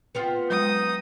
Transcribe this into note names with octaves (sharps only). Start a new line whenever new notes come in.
B3 C4 F4
F#3 G#3 D#4 D#6